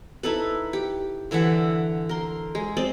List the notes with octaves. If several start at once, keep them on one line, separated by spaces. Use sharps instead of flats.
D#4 E4 A4 B4
G4
D3 E3 E5 F#5
A#4 C6
G#3
C4 C5 D5 D#5